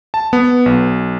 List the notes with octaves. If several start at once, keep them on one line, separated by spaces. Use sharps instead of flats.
A5
B3
B1